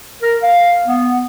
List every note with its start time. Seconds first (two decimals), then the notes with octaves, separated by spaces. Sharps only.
0.22 A#4
0.42 F5
0.86 B3